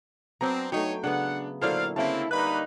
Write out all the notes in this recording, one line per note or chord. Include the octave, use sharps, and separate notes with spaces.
F#3 B3 C4 D4 A#5
F#3 A3 D#4 C#5 G5
C#3 B3 D4 F#5
A#2 D3 F#3 E4 A4 C5 D5 F5
C#3 A#3 C4 E4 E5 F5 A5
G3 A#3 D#4 B4 B5 F#6